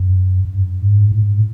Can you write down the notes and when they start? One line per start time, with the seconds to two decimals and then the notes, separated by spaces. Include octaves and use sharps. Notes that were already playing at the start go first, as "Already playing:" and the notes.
Already playing: F#2
0.45 F#2
0.53 G2
0.82 G#2
1.12 A2
1.22 G#2
1.31 A2